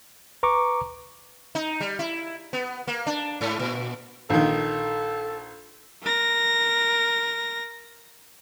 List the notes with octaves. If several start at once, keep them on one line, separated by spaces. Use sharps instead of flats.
B4 A#5 C#6 D6
D#4
G3
E4
B3
A#3
D4
G#2
A#2
A#1 D#3 A4
A#4 A#6